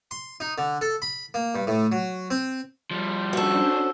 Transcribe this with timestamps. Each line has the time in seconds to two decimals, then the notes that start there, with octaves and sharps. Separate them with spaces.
0.11 C6
0.40 D#4
0.58 D3
0.81 A4
1.02 B5
1.34 A#3
1.55 G2
1.67 A2
1.92 F#3
2.31 C4
2.91 F3 G3
3.33 C#4 D4 F#4 A4 C5